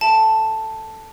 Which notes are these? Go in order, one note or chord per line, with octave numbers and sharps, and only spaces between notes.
A4 E5 G5 A5